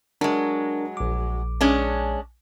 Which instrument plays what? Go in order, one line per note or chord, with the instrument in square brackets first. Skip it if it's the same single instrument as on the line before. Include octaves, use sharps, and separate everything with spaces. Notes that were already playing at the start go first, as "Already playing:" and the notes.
[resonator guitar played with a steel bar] F#3 G#3 [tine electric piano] D4 A#4 A5
[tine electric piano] A#1 D6
[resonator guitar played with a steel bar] G#3 C#4 D4